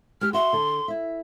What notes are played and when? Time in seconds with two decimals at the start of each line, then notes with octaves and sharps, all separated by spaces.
0.21 G#3 G4 F6
0.33 F#4 E5 C6
0.53 D3 A4
0.88 E4 E5